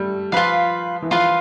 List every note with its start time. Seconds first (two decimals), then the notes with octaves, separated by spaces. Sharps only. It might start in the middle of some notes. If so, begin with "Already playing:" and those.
Already playing: G3 A3
0.32 F3 F4 B4 F5
1.02 E3
1.11 F3 F4 B4 F5